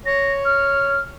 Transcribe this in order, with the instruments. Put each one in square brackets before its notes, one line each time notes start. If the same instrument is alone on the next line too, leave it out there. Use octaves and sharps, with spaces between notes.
[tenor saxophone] C#5 [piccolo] A#6
[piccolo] F6